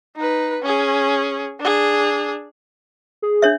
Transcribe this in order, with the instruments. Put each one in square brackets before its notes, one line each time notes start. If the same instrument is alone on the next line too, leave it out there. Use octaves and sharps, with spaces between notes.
[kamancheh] D#4 B4
C#4 G#4
D4 G#4
[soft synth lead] G#4
[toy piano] D4 C#5 E5